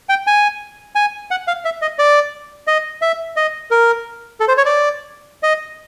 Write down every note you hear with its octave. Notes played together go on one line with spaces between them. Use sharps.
G5
G#5
G#5
F#5
F5
E5
D#5
D5
D#5
E5
D#5
A#4
A4
C5
C#5
D5
D#5